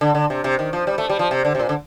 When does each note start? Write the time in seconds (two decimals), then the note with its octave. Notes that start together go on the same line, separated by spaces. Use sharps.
0.01 D3
0.15 D3
0.30 C3
0.44 C3
0.59 D#3
0.73 F3
0.87 G3
0.98 A3
1.10 G3
1.19 F3
1.31 C3
1.45 D3
1.55 C3
1.60 A#2
1.69 D3